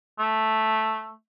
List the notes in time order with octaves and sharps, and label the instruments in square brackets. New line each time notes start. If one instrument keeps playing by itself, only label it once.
[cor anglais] A3